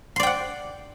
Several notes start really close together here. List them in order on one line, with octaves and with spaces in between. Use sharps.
C6 D5 G5 F#5